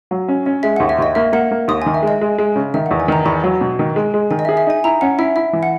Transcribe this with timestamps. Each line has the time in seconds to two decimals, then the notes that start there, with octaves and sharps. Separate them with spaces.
0.11 F#3
0.28 C#4
0.46 C#4
0.63 G#3 E5
0.76 D#2 F#5
0.89 E5
0.99 D#2 D#5
1.15 A#3 E5
1.33 A#3 F#5
1.51 A#3
1.68 D#2 D#6
1.82 D#3 G#5
1.94 E5
2.03 G#3 D#5
2.21 G#3
2.38 G#3
2.56 C#3
2.74 D#3 E5
2.86 E2 F#5
3.00 G#5
3.08 D#3 A#5
3.25 E2 B5
3.44 F#3
3.61 B2
3.79 D#3
3.96 G#3
4.14 G#3
4.31 D#3 G#5
4.39 D#5
4.45 E5
4.49 G#4
4.57 E5
4.67 D#4 G#5
4.84 E4 A#5
5.01 C#4 F#5
5.19 E4 E5
5.36 E4 E5
5.53 E3
5.63 F#5